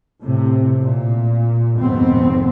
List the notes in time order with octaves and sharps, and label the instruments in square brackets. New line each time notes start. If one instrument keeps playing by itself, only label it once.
[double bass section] A2 C3
A#2
F1 D#2 G#2 B3 C4